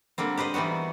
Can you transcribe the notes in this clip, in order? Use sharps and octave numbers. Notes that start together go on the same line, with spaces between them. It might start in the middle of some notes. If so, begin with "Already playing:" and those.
D3 G3 A#3 C4
G4 B4 C5 D#5
E3 G3 B3 D#4 F#4